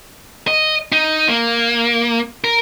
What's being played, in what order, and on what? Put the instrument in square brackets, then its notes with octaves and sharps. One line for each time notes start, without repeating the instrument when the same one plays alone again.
[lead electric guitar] D#5
D#4
A#3
A#4